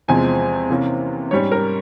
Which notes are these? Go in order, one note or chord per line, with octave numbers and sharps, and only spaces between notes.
E2 C3 F3 G#3 C4 G#5
C3 E3 A#3 C#4
G#2 G3 C#4 C#5
A#4